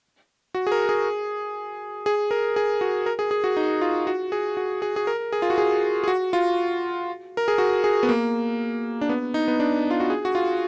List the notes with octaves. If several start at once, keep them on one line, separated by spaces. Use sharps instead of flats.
F#4
G#4
A#4
G#4
G#4
A#4
G#4
F#4
A#4
G#4
G#4
F#4
D#4
F4
F#4
G#4
F#4
G#4
G#4
A#4
G#4
F4
F#4
G#4
G#4
F#4
F4
A#4
G#4
F#4
G#4
B3
A#3
D4
B3
D#4
B3
D4
F4
F#4
G#4
F#4
F4